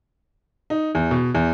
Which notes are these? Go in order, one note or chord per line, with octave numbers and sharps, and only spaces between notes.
D#4
E2
B2
E2